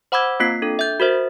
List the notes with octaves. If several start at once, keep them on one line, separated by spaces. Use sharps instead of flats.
C5 F#5 B5 D6 E6 G#6
A#3 C4 F4 C7
D4 A4
E5 G6
F#4 A#4 C5 E5